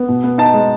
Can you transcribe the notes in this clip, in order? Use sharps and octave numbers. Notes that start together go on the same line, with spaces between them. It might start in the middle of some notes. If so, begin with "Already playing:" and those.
Already playing: B3
B2
B3
D#4 A5
G#3